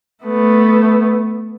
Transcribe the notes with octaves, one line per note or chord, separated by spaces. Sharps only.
A3 B3